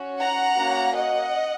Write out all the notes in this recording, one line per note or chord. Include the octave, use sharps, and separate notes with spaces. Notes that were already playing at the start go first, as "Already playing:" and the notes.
Already playing: C#4 F#4
F#5 A#5
A#3 C#4 F#4
D#5 F#5